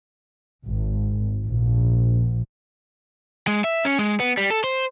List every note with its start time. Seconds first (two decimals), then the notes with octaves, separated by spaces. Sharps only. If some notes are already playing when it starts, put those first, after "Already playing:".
0.65 G#1
1.45 A#1
3.47 G#3
3.64 E5
3.85 C#4
3.99 G#3
4.20 B3
4.37 G3
4.50 A4
4.64 C5